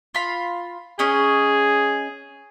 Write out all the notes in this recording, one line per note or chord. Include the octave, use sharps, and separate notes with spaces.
F4 B5
C#4 G#4 D#5